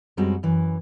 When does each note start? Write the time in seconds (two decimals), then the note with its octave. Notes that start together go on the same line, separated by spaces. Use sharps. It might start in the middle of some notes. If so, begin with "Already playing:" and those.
0.17 F#2 G3 G#3 C4 F#4
0.43 F#2 E3